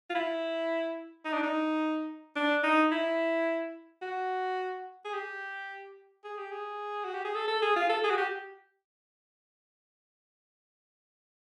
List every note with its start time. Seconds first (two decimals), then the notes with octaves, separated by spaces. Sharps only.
0.10 F4
0.15 E4
1.25 D#4
1.33 D4
1.43 D#4
2.36 D4
2.63 D#4
2.91 E4
4.02 F#4
5.05 G#4
5.14 G4
6.24 G#4
6.38 G4
6.52 G#4
7.04 F#4
7.14 G4
7.25 G#4
7.35 A4
7.48 A4
7.62 G#4
7.76 F4
7.89 A4
8.04 G#4
8.10 F#4
8.18 G4